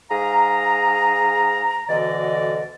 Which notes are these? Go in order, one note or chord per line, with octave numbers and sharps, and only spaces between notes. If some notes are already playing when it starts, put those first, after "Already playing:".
G#2 G#4 F5 A#5
D2 B2 D3 E3 D5 D#5